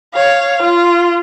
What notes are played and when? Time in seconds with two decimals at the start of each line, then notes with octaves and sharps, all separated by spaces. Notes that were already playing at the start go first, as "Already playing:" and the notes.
0.14 C#5 F5
0.63 F4